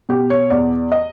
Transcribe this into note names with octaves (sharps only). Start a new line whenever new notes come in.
B2 G4
C#5
E2 D5
D#5